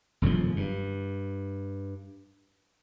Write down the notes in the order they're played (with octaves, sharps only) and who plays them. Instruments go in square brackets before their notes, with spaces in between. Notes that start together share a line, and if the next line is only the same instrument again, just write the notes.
[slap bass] E1 F#2 D3 F3
G2